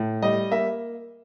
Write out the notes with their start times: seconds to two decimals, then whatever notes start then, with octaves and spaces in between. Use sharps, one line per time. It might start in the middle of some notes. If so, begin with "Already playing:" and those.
Already playing: A2
0.22 G3 D#5
0.51 A#3 E5